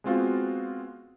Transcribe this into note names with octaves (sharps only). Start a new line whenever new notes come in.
G#3 B3 C4 F4 F#4